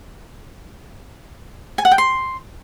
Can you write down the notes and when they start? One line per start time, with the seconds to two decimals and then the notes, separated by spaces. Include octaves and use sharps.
1.78 G#5
1.85 F#5
1.91 G5
1.98 C6